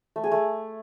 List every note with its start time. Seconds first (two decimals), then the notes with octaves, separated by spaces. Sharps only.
0.16 A3
0.24 G#4
0.31 A3